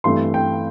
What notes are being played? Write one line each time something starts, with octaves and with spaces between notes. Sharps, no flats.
G2 E3 A3 C4 C6
G5